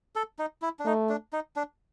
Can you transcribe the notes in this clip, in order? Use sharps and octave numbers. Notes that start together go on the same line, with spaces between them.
A4
D#4
E4
D4
A3 D#4
D4
D#4
D4